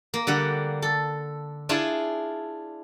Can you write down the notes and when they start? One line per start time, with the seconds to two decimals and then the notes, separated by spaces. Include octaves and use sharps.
0.14 A#3
0.27 D3 G3 F#5
0.82 A4
1.69 D4 E4 F4 G#4